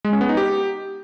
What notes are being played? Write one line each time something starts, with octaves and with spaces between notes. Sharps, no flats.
G#3
C#4
B3
D#4
G4